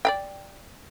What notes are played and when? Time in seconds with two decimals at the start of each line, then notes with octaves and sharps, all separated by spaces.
0.05 D5 F5 G5